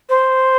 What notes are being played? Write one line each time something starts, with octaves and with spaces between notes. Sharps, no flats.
C5